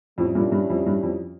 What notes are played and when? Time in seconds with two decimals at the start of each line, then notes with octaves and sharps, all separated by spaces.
0.17 F2 A2 G3 C#4 E4
0.35 G2 A#2
0.52 G2
0.70 F2
0.86 G2
1.03 F2